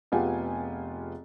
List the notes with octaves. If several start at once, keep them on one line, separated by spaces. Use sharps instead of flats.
F1 B3 F4 G4 G#4 G#5